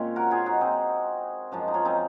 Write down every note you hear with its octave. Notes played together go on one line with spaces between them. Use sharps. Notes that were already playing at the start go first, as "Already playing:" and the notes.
Already playing: A#2 G#3 C4 C#4
F#4 A#4
F4 G#4
D#4 F#4
C4 D#4
F#2 F3 G#3
D#4
C#4 F4
C4 D#4